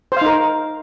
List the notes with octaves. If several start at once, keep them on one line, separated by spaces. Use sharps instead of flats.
D#4 A#4 C5 F5